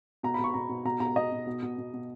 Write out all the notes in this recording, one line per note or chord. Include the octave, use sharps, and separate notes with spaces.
B2 A#5
B5
B2 C#6
B2 A#5
B2
B2 A#5
B2 A#5
B2 D#5
B2
B2
B2
B2
B2